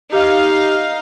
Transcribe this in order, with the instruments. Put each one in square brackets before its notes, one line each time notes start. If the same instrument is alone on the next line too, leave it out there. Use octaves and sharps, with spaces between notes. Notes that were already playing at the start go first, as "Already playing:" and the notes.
[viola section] D#4 F5 [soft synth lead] G4